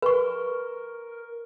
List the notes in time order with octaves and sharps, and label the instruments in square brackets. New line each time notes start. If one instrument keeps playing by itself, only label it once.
[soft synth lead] A#4 [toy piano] B4 C#6